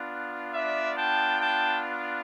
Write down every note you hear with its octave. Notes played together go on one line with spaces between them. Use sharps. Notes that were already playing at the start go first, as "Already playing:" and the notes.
Already playing: B3 D4 F4
D5 E5
G5 A5
G5 A5